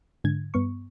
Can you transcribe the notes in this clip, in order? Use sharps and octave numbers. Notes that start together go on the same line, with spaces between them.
G#2 D3 G#6
G2 B3 C#6